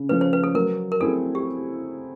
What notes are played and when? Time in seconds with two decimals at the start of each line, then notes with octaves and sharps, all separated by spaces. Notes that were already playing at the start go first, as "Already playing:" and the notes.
Already playing: C#3
0.09 F3 A3 C#4 B4
0.21 C5
0.33 B4
0.43 A4
0.54 F#3 A#4
0.92 A#4
1.01 A3 C4 E4 G#4 A4
1.35 G4